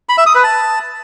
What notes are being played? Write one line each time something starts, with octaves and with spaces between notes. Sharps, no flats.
B5
E5
D#6
B4
A5